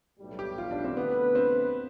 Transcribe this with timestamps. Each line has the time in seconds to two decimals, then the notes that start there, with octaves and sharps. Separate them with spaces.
0.20 B1 A2 G3
0.39 G4
0.58 F4
0.71 D4
0.84 C4
0.97 D2 D3 A3 B3 E4 B4
1.35 C4